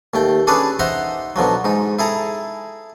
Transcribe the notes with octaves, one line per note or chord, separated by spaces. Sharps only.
D#2 A3 G5
C#4 D4 G#4 A4 B4 D5
D#4 C5 E5 F#5 A#5 C6
B2 D3 F3 F#3
G#2 D#4
E4 G#4 A4 A#5